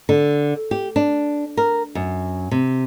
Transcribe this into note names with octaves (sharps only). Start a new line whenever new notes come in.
D3
G4
D4
A#4
F#2
C3